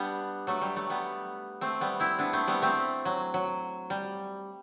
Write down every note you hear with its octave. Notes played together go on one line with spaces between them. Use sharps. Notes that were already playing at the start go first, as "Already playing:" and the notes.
Already playing: G3 B3 D4
F#3 A3
G3
F#3 A3
G3 B3
A3 C4
G3 B3
C4 E4
B3 D4
A3 C4
G3 B3
A3 C4
F#3
F#3
G3